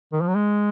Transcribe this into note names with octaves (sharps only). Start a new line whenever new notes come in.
D#3
F3
F#3
G#3